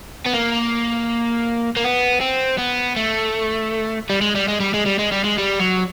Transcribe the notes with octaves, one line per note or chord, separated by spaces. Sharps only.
B3
A#3
A#3
B3
C4
B3
A3
G3
G#3
G3
G#3
G3
G#3
G3
G#3
G3
G#3
G3
F#3